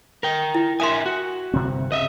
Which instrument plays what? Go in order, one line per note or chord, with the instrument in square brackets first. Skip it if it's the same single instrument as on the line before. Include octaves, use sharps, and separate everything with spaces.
[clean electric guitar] A#4 G5
[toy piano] E4
[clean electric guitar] A#4 E5 G#5 [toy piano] C6 D#6
[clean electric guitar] F#4
[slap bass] G1 C3 C4
[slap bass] C#3 [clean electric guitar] D#5 E5